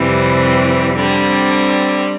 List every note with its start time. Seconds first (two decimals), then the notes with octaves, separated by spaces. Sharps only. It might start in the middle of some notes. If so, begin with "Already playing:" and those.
Already playing: F2 C3 E3 G3 C4
0.96 D3 G3 C4